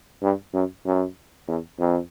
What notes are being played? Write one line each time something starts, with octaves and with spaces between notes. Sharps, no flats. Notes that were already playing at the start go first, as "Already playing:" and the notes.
G2
F#2
F#2
E2
F2